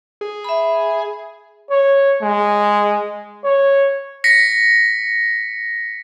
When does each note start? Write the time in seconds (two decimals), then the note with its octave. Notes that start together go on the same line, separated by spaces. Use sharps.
0.21 G#4
0.44 E5 B5
1.71 C#5
2.22 G#3
3.44 C#5
4.24 A#6 B6 C#7